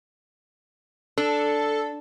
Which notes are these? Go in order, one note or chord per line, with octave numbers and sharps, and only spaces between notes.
D4 A4